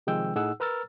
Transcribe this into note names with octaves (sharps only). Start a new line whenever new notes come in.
C3 D#3 F3 G#3 G5 E6
A2 D#4 G#4 F#5 E6
A#4 B4 A#5 E6 F6 A6